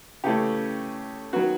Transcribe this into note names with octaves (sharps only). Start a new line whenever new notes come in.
C#3 E3 A3 C#4 G4
D#3 F#3 B3 F#4